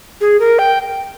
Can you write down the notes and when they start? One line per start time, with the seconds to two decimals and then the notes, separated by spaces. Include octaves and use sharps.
0.21 G#4
0.40 A#4
0.59 G5